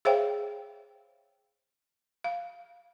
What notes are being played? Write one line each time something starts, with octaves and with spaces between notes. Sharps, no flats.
G#4 C5 C#5 E5 F5 G5
F5